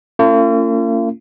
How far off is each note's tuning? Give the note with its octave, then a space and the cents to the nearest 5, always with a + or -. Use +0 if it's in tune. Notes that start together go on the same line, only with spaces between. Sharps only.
A#3 -45 C#4 +0 F4 -40